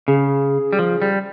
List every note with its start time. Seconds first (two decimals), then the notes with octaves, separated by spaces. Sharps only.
0.08 C#3 G#4
0.73 G3
0.79 F3
1.02 G3